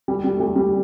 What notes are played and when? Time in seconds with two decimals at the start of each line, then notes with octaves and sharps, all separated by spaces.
0.08 G3
0.24 G3
0.37 A3
0.40 G3
0.56 G3